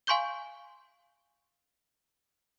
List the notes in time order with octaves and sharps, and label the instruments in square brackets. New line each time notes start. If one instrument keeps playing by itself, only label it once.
[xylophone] F5 G#5 C6 C#6 G6 G7